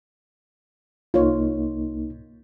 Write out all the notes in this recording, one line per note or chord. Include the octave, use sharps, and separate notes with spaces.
C2 A#3 D#4 F4 C#5